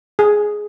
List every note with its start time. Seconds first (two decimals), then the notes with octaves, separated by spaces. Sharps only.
0.19 G#4